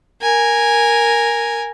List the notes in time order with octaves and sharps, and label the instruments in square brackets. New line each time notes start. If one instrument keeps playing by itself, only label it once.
[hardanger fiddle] A#4 G#5